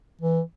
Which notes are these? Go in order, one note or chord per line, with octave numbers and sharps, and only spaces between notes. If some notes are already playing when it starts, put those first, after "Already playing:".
E3